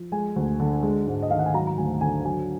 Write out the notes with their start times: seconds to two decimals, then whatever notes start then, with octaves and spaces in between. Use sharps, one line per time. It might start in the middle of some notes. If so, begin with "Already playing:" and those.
Already playing: F3
0.12 G#3 G#5
0.36 D2
0.60 D3
0.83 G#3
1.07 G#2
1.23 D#5
1.30 D#3 F5
1.39 F#5
1.46 G#5
1.54 F#3 A#5
1.67 A#5
1.78 D2 G#5
2.01 D3 G#5
2.24 F#3 G#5